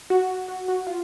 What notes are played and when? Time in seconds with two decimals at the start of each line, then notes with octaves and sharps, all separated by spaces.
0.10 F#4
0.48 F#4
0.68 F#4
0.87 F4